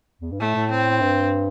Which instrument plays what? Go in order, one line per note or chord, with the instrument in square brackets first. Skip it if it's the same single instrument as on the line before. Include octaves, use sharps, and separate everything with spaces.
[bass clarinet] E2
G2
[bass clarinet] A2 [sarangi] A3
[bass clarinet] A2
[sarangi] C4
[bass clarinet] G2